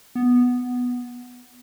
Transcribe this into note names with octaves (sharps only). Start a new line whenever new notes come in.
B3